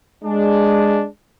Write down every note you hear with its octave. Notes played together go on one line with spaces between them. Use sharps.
G#3 D4